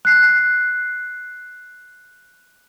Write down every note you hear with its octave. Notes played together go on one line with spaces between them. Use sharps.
F#6 C7